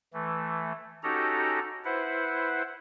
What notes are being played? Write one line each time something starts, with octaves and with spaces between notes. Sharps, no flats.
E3 A3
C#4 D#4 F#4 G4 A4 A#5
E4 B4 C5 F#5